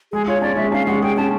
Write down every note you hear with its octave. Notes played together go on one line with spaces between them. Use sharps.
G#3 G#4
F4 C#5
C#4 D5
G#3 E5
C#4 F5
G#3 F#5
G#4 G5
C#4 A5